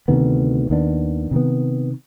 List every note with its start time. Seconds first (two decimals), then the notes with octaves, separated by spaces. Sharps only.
0.08 D2 C3 D#3 B3
0.70 D#2 D#3 B3 D4
1.31 C3 D#3 B3